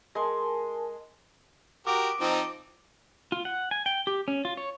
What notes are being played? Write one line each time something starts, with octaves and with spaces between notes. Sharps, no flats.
G#3 A#4 G#5 A5 C6
F#4 G4 A#4 D6 D#6 D7
F3 C4 D#4
F4
F#5
G#5
G5
G4
C#4
F4
C#5